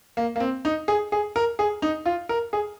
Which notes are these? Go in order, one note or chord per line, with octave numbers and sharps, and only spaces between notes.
A#3
A#3
C4
D#4
G#4
G#4
A#4
G#4
D#4
F4
A#4
G#4